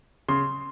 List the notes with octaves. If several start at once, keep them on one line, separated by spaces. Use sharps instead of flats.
C#3 C6